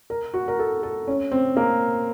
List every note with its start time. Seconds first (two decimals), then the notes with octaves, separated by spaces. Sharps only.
0.10 A#4
0.34 F#4
0.48 A#4
0.59 A4
0.83 A4
1.07 C#4
1.32 C4
1.57 A#3